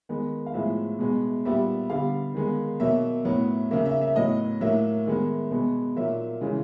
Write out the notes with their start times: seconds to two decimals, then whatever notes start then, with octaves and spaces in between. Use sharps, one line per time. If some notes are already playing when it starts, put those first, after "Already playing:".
0.09 D#3 G#3 B3
0.46 F5
0.54 A2 F3 G#3 B3 E5
0.99 B2 G#3 B3
1.45 A#2 G3 B3 E5
1.90 D3 G3 B3 F5
2.35 D#3 G#3 B3
2.80 B2 F#3 A#3 E5
3.25 A2 F#3 B3
3.71 C#3 F#3 A#3 E5
3.86 E5
4.01 E5
4.15 A2 F#3 B3 D#5
4.61 A2 F#3 A#3 E5
5.07 D#3 G#3 B3
5.51 B2 G#3 B3
5.96 A#2 F#3 A#3 E5
6.41 C#3 E3 G#3